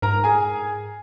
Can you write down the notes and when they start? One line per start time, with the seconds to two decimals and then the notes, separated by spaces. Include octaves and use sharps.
0.02 G#2 A#4 A#5
0.24 G#4 G#5